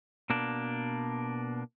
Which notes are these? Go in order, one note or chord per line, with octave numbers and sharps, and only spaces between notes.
B2 A#3 D4